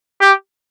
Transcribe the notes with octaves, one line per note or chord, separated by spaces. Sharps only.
G4